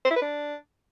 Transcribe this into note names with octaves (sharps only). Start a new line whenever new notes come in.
C5
E4
B4
D4